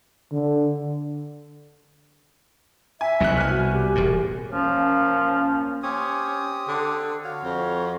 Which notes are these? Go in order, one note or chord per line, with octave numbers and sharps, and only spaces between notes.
D3
E5 G#5
F#1 C2 B2 F#6
G#5 F6
F#4
G4
E1 A2
F3 A#3 C#4
C4 C#4 G4 D#6
D3
F#4 C#5 F5
F2